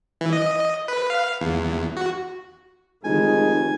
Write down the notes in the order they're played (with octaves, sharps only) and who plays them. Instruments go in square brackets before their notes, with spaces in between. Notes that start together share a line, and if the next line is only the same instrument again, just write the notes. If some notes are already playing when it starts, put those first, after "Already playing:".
[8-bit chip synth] E3
D#5
B4
F5
E2
F#4
[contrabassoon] F1 [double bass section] D#3 [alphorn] G#3 [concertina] G#5